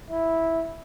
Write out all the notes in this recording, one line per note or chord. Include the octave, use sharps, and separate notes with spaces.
E4